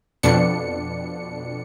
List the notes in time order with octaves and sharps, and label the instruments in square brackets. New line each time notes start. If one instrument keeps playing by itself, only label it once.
[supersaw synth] F2 B2 D4 C#7